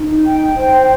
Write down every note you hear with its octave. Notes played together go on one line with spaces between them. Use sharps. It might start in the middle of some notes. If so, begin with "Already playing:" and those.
Already playing: D#4
G5
C5